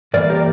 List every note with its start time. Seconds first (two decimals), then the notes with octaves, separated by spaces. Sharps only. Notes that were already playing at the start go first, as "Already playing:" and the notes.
0.14 G2 E3 A#3 A#4 D5
0.30 G4 A#4